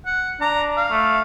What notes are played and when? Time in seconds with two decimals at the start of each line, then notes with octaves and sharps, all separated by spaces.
0.06 F#5
0.41 D4 A#5
0.77 F5
0.91 A3